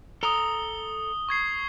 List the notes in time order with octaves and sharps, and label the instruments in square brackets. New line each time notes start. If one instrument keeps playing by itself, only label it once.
[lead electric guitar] A4 A#5 [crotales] D#6 G7
[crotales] C#6 G#6 C7